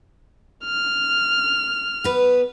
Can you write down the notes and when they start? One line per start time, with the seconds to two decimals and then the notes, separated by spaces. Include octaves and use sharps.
0.65 F6
2.04 B3 B4